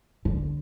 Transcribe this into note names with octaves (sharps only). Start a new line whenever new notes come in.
D3